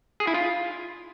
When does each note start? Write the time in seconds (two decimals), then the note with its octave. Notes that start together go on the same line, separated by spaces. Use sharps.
0.20 G#4
0.27 E4
0.34 F4